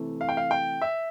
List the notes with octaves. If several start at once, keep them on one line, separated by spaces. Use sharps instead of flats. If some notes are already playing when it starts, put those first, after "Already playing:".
Already playing: C3 E3 A3
F5
G5
F5
G5
E5